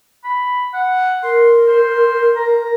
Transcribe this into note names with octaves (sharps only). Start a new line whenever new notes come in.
B5
F#5
A#4 C6
C5
A#5